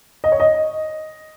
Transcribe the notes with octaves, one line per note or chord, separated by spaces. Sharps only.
D#5
C#5
D#5